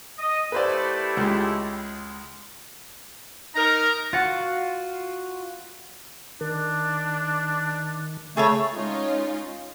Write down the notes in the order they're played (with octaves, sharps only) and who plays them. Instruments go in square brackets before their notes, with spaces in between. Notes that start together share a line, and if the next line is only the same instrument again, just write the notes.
[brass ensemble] D#5
[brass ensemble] A3 E4 G4 [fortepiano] B4 C5 D5
[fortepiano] C#2 G#3
[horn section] D#4 A#4 [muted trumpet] A#5
[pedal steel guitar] F4 F#4 [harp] F#5 A6
[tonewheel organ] D#3 [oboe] D4
[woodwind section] C#3 A3 [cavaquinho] G#4 A4 C#5
[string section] G#3 C#4 D#4 F4 C#5